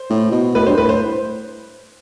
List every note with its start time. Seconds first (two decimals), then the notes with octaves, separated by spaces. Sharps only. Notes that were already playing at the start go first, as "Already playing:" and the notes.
Already playing: C5
0.10 A2
0.32 B2
0.55 A2 B4
0.66 G2 C5
0.77 A2 B4
0.89 C5